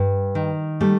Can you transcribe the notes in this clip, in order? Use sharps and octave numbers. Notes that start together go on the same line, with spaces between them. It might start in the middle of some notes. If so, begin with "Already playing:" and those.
Already playing: G2
D#3
G3 A3